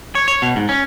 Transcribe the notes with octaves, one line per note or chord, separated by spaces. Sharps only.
C#5
C#5
B2
G#2
C#4